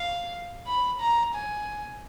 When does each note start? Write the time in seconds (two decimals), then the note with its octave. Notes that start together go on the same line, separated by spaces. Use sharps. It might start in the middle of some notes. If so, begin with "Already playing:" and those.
Already playing: F5
0.67 B5
1.00 A#5
1.34 G#5